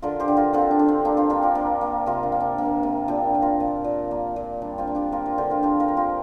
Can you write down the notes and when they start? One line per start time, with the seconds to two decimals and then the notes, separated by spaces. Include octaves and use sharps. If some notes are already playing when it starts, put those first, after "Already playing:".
0.02 D3 F4 A#4
0.20 G4 C5
0.28 D3
0.37 F4 A#4
0.53 D3 C4 F4
0.71 D4
0.79 D3
0.88 C4
1.05 A#3 D4
1.17 C4 F4
1.30 A#3 D4 G4
1.42 F4 A#4
1.55 A#3
1.81 A#3
2.06 C3 F4 A#4
2.23 D4
2.32 A#3
2.40 D4
2.58 A#3
2.83 C3
3.08 A#2 D4 G4
3.34 A#2
3.42 F4 A#4
3.60 A#2
3.84 A#2
4.11 A#3
4.36 A#2
4.62 G3 D4
4.78 C4 F4
4.87 A#3
4.95 D4 G4
5.12 A#3 F4 A#4
5.26 F4 A#4
5.38 D3 G4 C5
5.50 F4 A#4
5.63 F3 D4 G4
5.80 F4 A#4
5.88 A#3
5.97 C4 F4